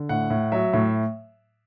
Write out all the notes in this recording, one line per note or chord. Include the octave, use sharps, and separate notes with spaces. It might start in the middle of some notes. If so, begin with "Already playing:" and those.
Already playing: D3
A2 F#5
A2
F#3 E5
A2